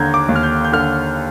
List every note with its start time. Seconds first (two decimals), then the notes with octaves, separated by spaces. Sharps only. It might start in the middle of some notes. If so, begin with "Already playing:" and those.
Already playing: D#2 D3 A#5 G6 G#6
0.14 D6
0.29 D#2
0.36 F6
0.43 G6
0.65 G6
0.72 D3 F6